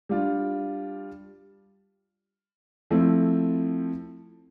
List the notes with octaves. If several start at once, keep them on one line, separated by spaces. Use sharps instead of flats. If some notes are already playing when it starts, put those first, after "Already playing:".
G3 D4 F4
F3 A3 C4 E4